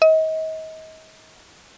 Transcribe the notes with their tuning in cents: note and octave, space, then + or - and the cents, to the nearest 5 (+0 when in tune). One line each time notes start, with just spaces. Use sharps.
D#5 +35